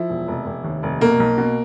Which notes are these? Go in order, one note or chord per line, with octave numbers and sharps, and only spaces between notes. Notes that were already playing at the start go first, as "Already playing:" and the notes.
Already playing: F3 E4
E1
F1
F1
D#2
F1
B2 A#3
B1
B2